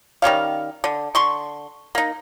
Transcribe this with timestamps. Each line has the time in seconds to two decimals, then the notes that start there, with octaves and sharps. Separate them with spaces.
0.22 D#3 G3 C#4 F5
0.84 D3
1.15 D3 C6 C#6
1.95 A#3 D#4